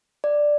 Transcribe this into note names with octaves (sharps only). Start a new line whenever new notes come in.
D5